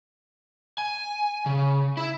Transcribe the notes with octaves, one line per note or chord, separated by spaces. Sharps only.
G#5
C#3
E4